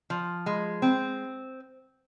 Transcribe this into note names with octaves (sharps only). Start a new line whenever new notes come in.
F3
G#3
C4